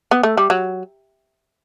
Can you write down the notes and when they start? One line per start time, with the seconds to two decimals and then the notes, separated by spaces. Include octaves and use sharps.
0.11 B3
0.23 A3
0.37 G3
0.50 F#3